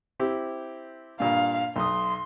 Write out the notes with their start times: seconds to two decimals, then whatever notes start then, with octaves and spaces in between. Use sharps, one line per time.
0.20 C4 E4 G4
1.20 G2 A#2 F5
1.76 B1 C6 D#6